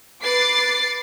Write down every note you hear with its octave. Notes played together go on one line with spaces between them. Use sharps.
B4 D6 A6 C7